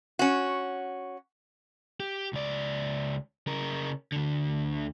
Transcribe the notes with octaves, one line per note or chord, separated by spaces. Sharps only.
C#4 F#4
G4
C#2 D5
C#3 A#4
D2 D3